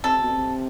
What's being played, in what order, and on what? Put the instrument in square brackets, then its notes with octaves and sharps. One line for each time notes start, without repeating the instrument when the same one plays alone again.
[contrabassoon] C3 [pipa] A4
[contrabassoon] B2
C3